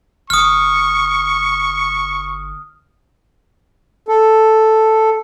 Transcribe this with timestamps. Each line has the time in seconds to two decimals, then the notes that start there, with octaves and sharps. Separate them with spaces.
0.30 G1 C#6 D#6 F6
4.08 A4